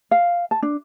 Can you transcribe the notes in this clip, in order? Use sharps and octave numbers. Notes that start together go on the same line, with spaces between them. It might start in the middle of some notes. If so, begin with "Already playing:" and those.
F5
A5
D4